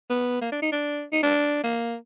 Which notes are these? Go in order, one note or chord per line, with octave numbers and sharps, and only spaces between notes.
B3
A#3
D4
D#4
D4
D#4
D4
A#3